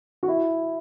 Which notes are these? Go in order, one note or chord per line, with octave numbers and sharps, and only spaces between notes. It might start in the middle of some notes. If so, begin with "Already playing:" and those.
F#4
E4